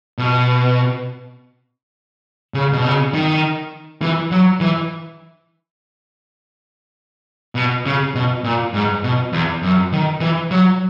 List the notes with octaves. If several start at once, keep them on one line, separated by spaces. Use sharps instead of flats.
B2
C#3
B2
C#3
D#3
E3
F#3
E3
B2
C#3
B2
A#2
G#2
B2
E2
F#2
D#3
E3
F#3